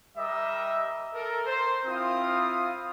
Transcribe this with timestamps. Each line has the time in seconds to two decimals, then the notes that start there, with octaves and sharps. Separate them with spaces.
0.17 G3 A#4 D#5 E5
1.13 A4 A#4
1.47 C5
1.86 C4 E4 F4 F5 D#6